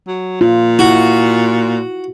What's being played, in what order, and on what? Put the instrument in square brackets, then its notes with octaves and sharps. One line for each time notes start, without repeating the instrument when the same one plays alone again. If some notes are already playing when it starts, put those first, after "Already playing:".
[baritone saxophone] F#3
[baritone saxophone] A#2 [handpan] F4
[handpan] E4 [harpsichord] F#4